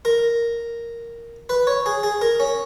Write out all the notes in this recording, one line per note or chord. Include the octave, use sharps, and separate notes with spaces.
A#4
B4
C#5
G#4
G#4
A#4
C#4